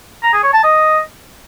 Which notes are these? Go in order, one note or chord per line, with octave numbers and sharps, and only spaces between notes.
A#5
G#4
C#5
A5
D#5